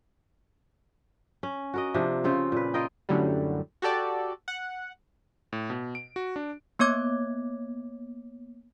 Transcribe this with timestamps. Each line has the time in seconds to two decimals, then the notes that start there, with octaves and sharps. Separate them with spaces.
1.43 C#4
1.74 F#4 A#4 D#5
1.94 C3 F3 D4
2.24 C#3 C4 F4 C#5
2.52 A#2 B4
2.74 F4 A#4 D#5 G5
3.09 F#2 A2 D3 F#3 G3
3.82 F#4 G4 A4 D5
4.48 F#5
5.53 A2
5.70 B2
5.95 D7
6.16 F#4
6.36 D4
6.79 A#3 B3 C#5 D6 G#6